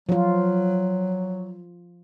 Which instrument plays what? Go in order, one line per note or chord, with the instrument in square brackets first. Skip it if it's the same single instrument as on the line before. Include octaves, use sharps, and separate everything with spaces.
[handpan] F3 F4 [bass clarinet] F#3